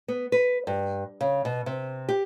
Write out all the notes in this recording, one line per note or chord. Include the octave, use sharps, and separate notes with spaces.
B3
B4
G2
C#3
B2
C3
G4